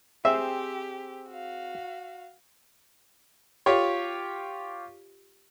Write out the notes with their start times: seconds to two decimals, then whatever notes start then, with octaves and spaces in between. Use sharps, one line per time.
0.25 C4 G4 G#4 C5 E5
1.29 F#4 F5
3.66 F4 G4 C#5